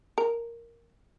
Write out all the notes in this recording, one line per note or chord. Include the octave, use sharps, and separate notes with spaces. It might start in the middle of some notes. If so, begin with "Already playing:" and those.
A#4